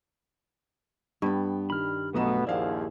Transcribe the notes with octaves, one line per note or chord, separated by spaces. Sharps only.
G2 B3 G5
D#3 G3 B5 F6
B1 B2 A3 B3 A#5 D#6 E7
A#1 D#2 F3 E4 G#4 D5 F5 F#5